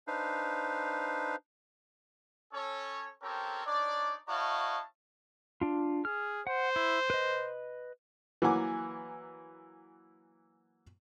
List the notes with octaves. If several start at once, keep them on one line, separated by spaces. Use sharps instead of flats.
D4 D#4 B4 C5 F5
C#4 A4 C#5
C4 C#4 G4 A4 A#4 C#5
D4 D#4 C#5 D5
E4 F#4 C#5 D#5 F5 A5
D4 F4
G#4 F6
C5 F#5
E4
B4 D#5
E3 F#3 A#3 F#5 G#5 D6